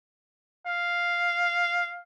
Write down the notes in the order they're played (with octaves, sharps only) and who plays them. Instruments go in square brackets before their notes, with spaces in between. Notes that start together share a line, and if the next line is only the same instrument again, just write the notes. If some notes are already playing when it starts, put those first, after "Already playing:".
[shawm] F5